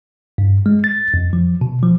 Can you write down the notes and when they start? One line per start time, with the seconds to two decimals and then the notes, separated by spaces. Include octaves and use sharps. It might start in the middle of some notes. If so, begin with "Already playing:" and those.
0.38 G2
0.66 G#3
0.84 A6
1.14 F2
1.33 F3
1.61 B2
1.83 F3